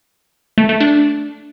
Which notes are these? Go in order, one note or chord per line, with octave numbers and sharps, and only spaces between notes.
A3
A3
D4